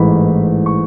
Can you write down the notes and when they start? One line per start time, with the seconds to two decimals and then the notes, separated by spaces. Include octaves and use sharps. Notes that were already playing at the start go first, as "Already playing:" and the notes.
Already playing: A1 G#2 E3 A3 B5
0.66 C#6